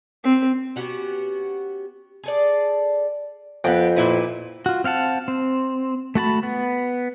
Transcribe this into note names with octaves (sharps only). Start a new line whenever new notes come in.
C4
B3 C#4 F#4 G4
G#4 A4 D5
F2 B3 G5
A#2 E4 B4
F4 F#4
C4 F5 F#5 A5
C4
A3 F#4 A5 B5
B3